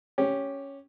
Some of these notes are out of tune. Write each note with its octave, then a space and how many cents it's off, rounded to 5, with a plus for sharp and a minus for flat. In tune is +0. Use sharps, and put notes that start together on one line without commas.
C#4 +0 G4 +0